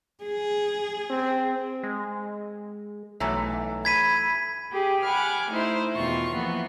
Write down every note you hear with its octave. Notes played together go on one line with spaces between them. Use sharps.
G#4
C4
G#3
B1 E3 F#3 A3
B5 G#6 B6 D#7
G4 G#4
F#5 G#5 B5 D6 F6
A3 D#4 E4 C5
E2 B2 D#3 F4 C#6
E3 F3 A#3 B3